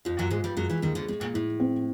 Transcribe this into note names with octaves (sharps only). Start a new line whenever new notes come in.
F2 F3 F4
F#2 F#3
G#2 G#3 F4
G2 G3
F#2 F#3 G#3
E2 E3
D#2 D#3 G#3
D2 D3
A2 G#3
A#2
A2 E4
C4